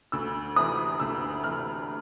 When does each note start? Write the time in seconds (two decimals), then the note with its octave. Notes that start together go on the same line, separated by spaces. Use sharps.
0.12 D2 E6
0.56 C3 E3 D#6
1.00 D2 E6
1.44 C3 E3 F6